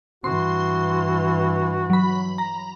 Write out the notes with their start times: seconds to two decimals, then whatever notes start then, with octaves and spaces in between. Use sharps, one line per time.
0.24 G2 E3 F#4 C6
1.90 F#3 B5
2.38 A#5